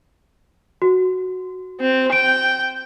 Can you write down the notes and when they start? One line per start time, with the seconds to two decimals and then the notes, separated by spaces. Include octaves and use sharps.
0.82 F#4
1.80 C4
2.12 G5 D7